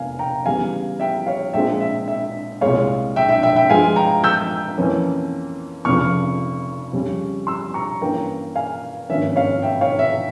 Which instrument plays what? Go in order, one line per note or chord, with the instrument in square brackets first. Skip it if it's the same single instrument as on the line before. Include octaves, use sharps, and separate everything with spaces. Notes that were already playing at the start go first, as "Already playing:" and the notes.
Already playing: [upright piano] F1 E2 A#3 F5 G#5
G5 A#5
E2 C#3 G3 F5 G#5
E5 G5
C#5 F5
A#1 A#2 G#3 C4 E5 G5
E5
E5
C2 A#2 G#3 C#5 F5
E5 G5
E5 G5
E5 G5
E5 G5
G2 F3 G#3 F5 G#5
G5 A#5
E6 G6
F2 E3 A#3 C#4
F1 F2 C#3 F3 C#6 F6
F2 C#3 G3 C#4
C6 E6
A#5 C#6
G2 E3 A#3 C#4 G5 A#5
F5 G#5
G#1 G2 F3 A#3 C#4 E5
C#5 F5
E5 G5
C#5 F5
E5